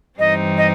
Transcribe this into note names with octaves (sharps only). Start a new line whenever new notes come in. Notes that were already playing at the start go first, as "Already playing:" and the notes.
G2 E3 G3 C4 D#4 D#5
D#5